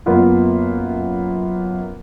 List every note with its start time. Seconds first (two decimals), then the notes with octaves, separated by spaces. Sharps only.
0.06 F#2 A#3 B3 F4